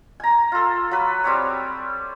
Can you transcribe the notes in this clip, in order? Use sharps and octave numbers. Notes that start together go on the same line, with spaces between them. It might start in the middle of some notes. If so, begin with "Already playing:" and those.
G#5 A#5
F4 A4
F#3 B4
G3 C4 C#5